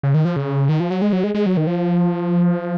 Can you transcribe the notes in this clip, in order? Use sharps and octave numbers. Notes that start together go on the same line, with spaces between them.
C#3
D#3
F3
C#3
D#3
F3
F#3
G#3
F#3
G#3
G#3
F#3
D#3
F3